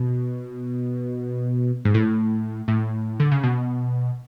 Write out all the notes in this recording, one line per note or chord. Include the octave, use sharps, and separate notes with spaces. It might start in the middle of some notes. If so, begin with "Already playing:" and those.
Already playing: B2
G#2
A2
A2
D3
C#3
B2